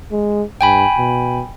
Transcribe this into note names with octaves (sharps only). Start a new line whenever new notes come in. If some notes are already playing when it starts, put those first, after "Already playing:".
G#3
G2 G5 G#5 B5
B2